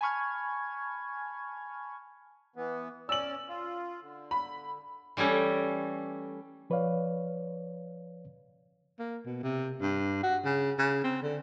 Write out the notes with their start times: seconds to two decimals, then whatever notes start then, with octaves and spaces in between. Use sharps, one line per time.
0.01 G#5 A5 B5 C#6 F6 G#6
2.56 E3 B3
3.09 C#4 D5 E6 F#7
3.48 F4
4.01 D3
4.31 B5
5.17 E3 G3 A3 C#4 G5
6.70 F3 B4 C#5 D5 F5
8.99 A#3
9.26 B2
9.43 C3
9.82 G2
10.23 F#4
10.44 C#3
10.78 C#3
11.04 C4
11.23 D3